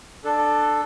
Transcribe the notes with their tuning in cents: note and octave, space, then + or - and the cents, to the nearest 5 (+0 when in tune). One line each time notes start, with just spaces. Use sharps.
D4 +20 A4 +0